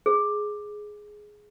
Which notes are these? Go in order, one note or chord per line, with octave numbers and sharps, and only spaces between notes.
G#4